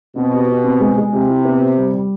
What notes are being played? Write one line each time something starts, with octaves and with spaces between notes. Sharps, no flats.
B2 C4
G4
G4
C4
G#3
G#3
C3 G4
E4
B3
G4
G3
G3